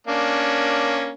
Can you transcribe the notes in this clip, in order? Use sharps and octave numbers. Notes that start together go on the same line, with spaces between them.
A#3 C#4 D4